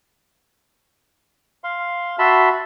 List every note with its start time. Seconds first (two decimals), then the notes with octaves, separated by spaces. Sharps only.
1.64 F5 C6
2.19 F#4 E5 A5 B5 C6